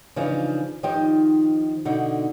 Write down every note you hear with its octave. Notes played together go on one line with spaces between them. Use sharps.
C#3 E3 F3 D4 D#4
D#3 F3 D#4 G4 D#5 G5
B2 D3 D#4